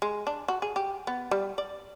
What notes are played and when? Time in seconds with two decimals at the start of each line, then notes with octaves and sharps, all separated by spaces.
0.02 G#3
0.27 D4
0.48 F#4
0.62 G#4
0.76 G4
1.07 B3
1.31 G3
1.58 D5